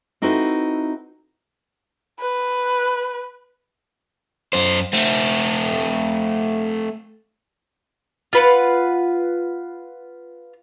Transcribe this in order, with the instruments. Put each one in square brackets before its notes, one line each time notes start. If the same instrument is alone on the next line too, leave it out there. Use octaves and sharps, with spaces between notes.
[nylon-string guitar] C4 D#4 E4 F#4 A4 B4
[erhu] B4
[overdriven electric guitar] F#2 C5
A3 C4
[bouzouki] F4 B4 F#5